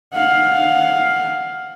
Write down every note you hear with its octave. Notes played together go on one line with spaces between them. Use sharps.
F5 F#5